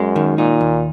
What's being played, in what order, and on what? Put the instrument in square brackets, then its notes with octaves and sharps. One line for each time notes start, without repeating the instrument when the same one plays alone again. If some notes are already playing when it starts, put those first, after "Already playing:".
Already playing: [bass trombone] F#2 [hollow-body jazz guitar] G#3
[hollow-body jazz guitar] D#3
[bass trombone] A#2 [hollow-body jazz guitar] D#4
[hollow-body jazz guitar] D#2